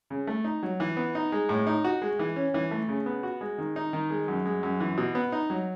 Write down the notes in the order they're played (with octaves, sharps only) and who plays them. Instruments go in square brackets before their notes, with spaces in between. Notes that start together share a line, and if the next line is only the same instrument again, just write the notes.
[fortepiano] C#3
A3
D#4
F#3
E3
B3
D#4
G#3
A2
D#4
F#4
G#3
E3
C#4
E3
A3
C#3
B3
F#4
G#3
D#3
D#4
D#3
G#3
F#2
G#3
F#2
E3
B2
B3
D#4
F#3